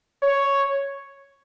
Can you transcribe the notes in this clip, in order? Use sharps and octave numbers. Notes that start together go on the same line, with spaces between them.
C#5